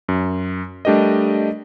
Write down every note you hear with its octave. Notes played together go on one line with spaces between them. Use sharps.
F#2
G3 A3 D4 G4 A#4 D#5